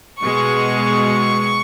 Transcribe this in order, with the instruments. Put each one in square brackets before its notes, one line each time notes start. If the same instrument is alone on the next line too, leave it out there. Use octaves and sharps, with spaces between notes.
[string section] B2 G#3 C#6